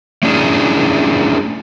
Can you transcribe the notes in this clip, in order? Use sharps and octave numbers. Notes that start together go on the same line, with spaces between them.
A3 C#4 D4 E4 G#4